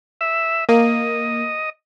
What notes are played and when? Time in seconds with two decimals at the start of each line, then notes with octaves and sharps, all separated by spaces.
0.21 E5
0.69 A#3 D#5